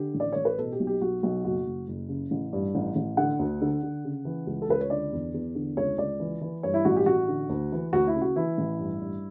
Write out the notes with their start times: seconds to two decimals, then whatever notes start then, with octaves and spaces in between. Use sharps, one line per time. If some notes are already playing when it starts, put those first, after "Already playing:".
Already playing: D3 G4
0.14 A1
0.20 D5
0.32 A1 C#5
0.45 B4
0.58 B2 A4
0.72 G4
0.80 B1
0.87 G4
1.01 B1 F#4
1.23 B1 F#4
1.45 F#1 F#4
1.66 F#1
1.88 F#1
2.09 C#3
2.31 A1
2.53 G2
2.75 A1
2.96 A1
3.17 D3 F#5
3.39 D2
3.61 D3
3.83 D3
4.05 C#3
4.25 E3
4.47 C#2
4.62 A4
4.68 C#2 B4
4.81 C#5
4.90 D3 D5
5.13 E2
5.34 E2
5.55 D3
5.77 C#2 C#5
5.98 C#2 D5
6.20 E3
6.41 E3
6.63 G2 C#5
6.74 E4
6.85 A1 F#4
6.96 G4
7.06 A1 F#4
7.28 D3
7.49 D2
7.72 E3
7.93 D2 F#4
8.07 E4
8.15 C#3
8.21 F#4
8.36 E3 E4
8.58 A1
8.79 G2
9.01 G2